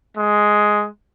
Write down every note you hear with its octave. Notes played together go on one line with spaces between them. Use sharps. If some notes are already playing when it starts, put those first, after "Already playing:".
G#3